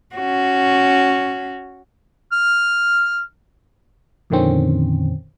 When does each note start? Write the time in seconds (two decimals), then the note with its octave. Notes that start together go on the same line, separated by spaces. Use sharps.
0.15 C#4 F#4
2.33 F6
4.30 F2 A#2 D3 D#3 C4 C#4